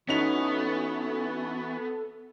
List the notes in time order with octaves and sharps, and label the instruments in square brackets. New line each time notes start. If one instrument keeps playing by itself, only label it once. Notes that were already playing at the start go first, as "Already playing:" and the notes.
[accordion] E3 E4 F#4 [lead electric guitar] B3 [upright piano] C#4 D#4 F7 [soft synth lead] A4